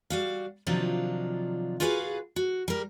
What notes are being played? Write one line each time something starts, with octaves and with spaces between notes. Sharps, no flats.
G3 F#4 F5
C3 D#3 F3 F#3 D4 F4
F4 F#4 G#4 B4 E5 F5
F#4
G3 A#4